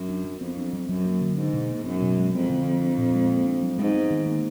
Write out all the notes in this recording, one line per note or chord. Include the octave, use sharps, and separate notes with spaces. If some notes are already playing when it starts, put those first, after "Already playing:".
Already playing: F#2
D4
F#3
F2 B3
D4
F#3
F#2 F#3
A#3
D3
G#2 D4
B2
A#3
F#2 B3
B2
G#3
F2 G#3
D3
F3
D4
A#2
G#3
A#3
D4
F#3
G#2 G#3
B3
D#3
A#3